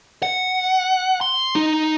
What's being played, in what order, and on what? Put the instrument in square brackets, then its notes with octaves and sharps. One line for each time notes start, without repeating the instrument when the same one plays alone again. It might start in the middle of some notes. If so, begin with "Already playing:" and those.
[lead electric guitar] F#5
C6
D#4